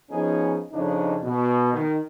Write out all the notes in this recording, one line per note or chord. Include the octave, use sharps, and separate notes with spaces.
F3 B3 C#4 D#4 G#4
F2 C#3 D4 D#4
B2
D#3